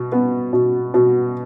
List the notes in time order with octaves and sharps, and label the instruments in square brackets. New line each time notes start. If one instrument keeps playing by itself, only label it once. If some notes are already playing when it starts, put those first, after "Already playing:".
Already playing: [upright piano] B2
B3
B2
B2